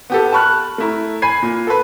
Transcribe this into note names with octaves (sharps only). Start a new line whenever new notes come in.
B3 G4 A4
A5 B5 C#6 F6 F#6
A3 E4 A#5
G#5 B5 G#6 C7 D#7
A#2
A4 B4